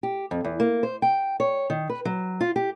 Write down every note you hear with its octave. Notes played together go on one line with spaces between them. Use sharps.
G4
F2
E2
A#3
C5
G5
C#5
D#3
B4
F#3
F4
G4